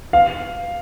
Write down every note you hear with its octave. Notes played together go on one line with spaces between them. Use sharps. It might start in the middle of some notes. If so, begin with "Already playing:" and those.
F5